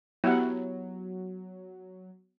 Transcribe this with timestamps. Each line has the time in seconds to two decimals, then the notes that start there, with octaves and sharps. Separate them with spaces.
0.24 F#3 B3 E4 G4 F#5